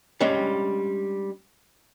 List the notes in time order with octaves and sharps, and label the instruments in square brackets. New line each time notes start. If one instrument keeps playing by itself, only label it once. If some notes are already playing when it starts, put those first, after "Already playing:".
[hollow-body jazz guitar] G3 G#3 C#4 D4